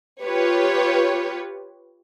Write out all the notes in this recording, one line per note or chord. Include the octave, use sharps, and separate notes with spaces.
F4 G4 B4 C#5